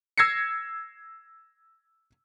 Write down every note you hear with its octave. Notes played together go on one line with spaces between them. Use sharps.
E6 G#6 A#6 C7 C#7